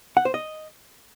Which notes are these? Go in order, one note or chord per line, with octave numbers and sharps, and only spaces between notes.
F#5
C5
D#5